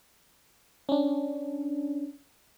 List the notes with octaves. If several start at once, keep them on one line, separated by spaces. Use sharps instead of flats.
C#4 D4